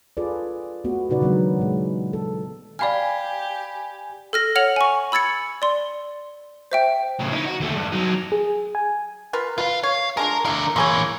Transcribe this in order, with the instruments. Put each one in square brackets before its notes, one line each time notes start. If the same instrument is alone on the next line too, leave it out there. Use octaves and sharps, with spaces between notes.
[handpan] F4 G#4 A4 B4 D5
A3 B3 F#4
A#2 C#3 D#4 F#4 B4 D5
D#3 F#3 G#3 B3 D4
A#2 G#3
A4
[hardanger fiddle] G4 [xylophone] D5 F5 F6 [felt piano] G#5 B5
[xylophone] A4 F6 A#6
C#5 F#5 F6 C#7 F7 F#7
G#5 C#6
B5 E6 G#6 A6 C#7
D5 C6
C5 E5 G5
[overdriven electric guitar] A2 C#3
D#4 E4
F#4
D#2 A3
G2
F#3 D#4
[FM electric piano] G#4
G#5
[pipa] F4 A#4 B4
[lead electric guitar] F4 F5 [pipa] B4
[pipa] C#5 [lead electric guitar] F5
[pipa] G#3 D4 F4 [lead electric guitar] A#4
[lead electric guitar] D3 A#4 [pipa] E4 F5
[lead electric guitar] A#2 E3 [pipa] A#3 G#4 C#5